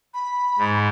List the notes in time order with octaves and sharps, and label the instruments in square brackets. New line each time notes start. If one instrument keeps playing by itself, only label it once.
[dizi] B5
[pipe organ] G#2